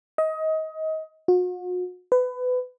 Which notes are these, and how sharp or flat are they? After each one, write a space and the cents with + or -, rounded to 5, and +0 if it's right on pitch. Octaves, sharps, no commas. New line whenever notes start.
D#5 +25
F#4 -40
B4 +25